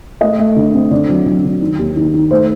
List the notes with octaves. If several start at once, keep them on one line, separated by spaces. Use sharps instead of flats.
A3 D#5
A3
D3
C4
D3 D5
F#3
F#3
D3
D#3
D#2
D#3
D#3
A3 C5